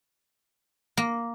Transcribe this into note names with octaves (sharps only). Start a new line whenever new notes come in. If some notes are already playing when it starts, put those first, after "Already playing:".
A#3